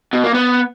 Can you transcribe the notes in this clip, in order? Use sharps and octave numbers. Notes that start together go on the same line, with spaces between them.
B2
A#3
B3